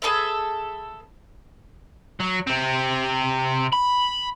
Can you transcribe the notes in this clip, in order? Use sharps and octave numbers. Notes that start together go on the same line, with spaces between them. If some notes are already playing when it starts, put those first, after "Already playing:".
G#4 A4 B4 E5
F#3
C3 C4
B5